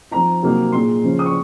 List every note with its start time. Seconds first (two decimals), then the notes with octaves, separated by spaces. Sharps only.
0.11 F3 C4 D#4 A#5
0.43 C3 F#3 A#3 D#4
0.72 A#2 G#3 D#4 C6
1.03 C#3 F3 G#3 C#4
1.19 D#6
1.26 C#6